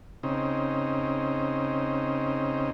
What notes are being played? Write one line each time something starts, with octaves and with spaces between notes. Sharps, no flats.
C#3 C4 D#4